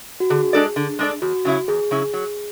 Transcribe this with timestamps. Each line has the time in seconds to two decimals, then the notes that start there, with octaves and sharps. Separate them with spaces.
0.20 F#4
0.30 D3 G#4
0.53 G#3 D4 A4 D5
0.76 D3
0.99 G#3 D4 A4 D5
1.22 E2 F#4
1.45 C#3 F#3 C#4 E4
1.68 E2 G#4
1.91 C#3 F#3 C#4 E4
2.14 F#3